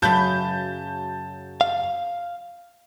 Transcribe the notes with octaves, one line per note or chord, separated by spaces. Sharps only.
F#2 C#3 F#3 B4 A5 G6
F5